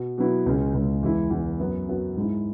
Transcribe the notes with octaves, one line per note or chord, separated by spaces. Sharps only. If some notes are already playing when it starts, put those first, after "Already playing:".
Already playing: B2
B2 F#3 B3 E4
C#2 C#3 G#3
C#2 C#3 G#3
E2 E3 G#3 E4
E2 E3 G#3 E4
F#2 F#3 B3
F#2 F#3 B3
G#2 G#3 E4